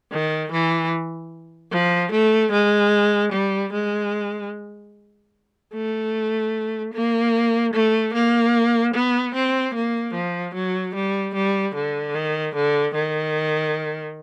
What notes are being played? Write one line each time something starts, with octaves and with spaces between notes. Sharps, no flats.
D#3
E3
F3
A3
G#3
G3
G#3
A3
A#3
A3
A#3
B3
C4
A#3
F3
F#3
G3
G3
D3
D#3
D3
D#3